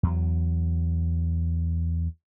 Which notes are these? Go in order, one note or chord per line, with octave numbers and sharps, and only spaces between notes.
E2 F#3